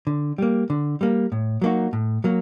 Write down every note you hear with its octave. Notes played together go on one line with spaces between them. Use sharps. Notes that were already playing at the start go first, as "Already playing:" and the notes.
D3
G3 A#3
D3
G3 A#3
A2
F#3 A#3 D#4 F#4
A2
F#3 A#3